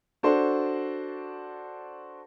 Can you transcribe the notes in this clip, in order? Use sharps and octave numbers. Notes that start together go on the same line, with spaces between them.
D4 F#4 A4 C5 D5